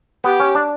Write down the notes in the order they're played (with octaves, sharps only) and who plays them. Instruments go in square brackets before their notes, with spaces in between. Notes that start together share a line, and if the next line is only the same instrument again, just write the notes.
[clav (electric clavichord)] B3 [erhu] G4
[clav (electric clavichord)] C#4
D4